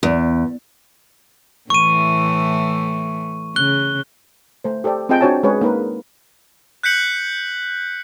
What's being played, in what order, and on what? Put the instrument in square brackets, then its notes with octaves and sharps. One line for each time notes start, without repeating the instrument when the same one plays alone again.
[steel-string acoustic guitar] E2
[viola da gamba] A2 E3 A3 [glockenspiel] C#6 D#7
[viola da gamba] C#3 [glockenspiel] F#6 G7
[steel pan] A3 C5
G4 A4 C5 D5 G5
C4 F4 G#4 D#5 G5 A5
D4 F#4 C5 C#5 G#5 A5
G#3 C#4 G#4 B4 C#5
A#3 D#4 A#4 B4
[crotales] F#6 G6 B6 C#7 F#7